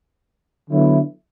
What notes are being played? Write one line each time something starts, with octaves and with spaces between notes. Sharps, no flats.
D3 F#3 B3 E4